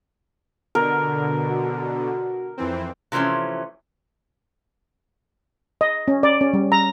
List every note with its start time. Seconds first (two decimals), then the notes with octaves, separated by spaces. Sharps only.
0.75 B2 D3 A#4
1.49 F#4
1.81 F#4
2.57 F2 E3 C4
3.12 C3 E3 F3 A3 C#4
5.81 D#5
6.08 C#4
6.23 D5
6.41 C#4
6.53 G3
6.72 A#5